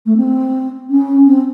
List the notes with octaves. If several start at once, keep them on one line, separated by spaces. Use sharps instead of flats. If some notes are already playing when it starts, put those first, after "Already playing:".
A3
C4
C#4
C4